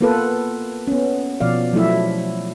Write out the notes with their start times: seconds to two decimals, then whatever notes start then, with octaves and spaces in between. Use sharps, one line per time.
0.01 A#3 B3 F4 A4 B4
0.87 B3 C#4
1.41 B2 F3 D5 F5
1.73 F3 F#3 A3 E4 E5